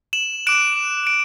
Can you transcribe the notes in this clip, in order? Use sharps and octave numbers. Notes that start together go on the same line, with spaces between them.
E7 F#7
D6 F#6 D7 E7
D7